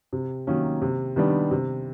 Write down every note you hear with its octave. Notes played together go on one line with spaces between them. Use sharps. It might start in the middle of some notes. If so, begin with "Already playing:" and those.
C3
D#3 F#3 A#3 C#4
C3
D#3 G3 B3 D4
C3